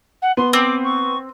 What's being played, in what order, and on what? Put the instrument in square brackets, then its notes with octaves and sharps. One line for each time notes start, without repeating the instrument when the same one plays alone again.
[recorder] F#5
[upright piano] B3 [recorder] C6
[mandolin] C4 [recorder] D6
[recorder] C#6